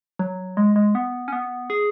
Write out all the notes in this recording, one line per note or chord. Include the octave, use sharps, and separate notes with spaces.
F#3
G#3
G#3
B3
C#4
B3
G#4